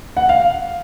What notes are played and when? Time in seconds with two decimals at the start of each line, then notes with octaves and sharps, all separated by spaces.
0.17 F#5
0.29 F5